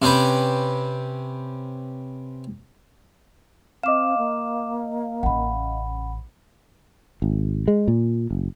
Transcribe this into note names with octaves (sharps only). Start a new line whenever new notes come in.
C3 C4 C#4 G4 B4
C4 D#5 F5 D6 E7
A#3
A1 C#3 F#5 B5
G#1
G#3
A#2
F#1